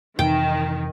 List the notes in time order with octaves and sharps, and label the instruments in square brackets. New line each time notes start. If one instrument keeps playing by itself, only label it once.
[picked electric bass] F2 C3 E3 [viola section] D#3 [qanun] G5